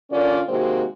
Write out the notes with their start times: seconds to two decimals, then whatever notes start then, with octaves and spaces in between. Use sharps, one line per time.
0.11 D3 C#4 F4 A#4 D5
0.49 C3 D#3 G#3 A#3 C4 F#4